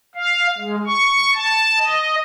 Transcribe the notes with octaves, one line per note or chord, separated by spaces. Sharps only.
F5
G#3
C#6
A5
D#5